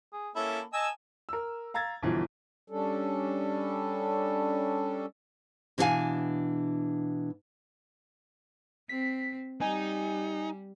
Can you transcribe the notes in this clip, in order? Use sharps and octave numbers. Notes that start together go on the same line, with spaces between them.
G#4
A#3 C#4 E4 A4
D#5 G#5 A5 E6
A#4 E6
F5 A#5 E6 G#6 A6
G1 B2 E3 F3
G3 C#4 D4 A4
B2 E3 D4 A4 F5 G#5
C4 B6
G3 D#4 G#5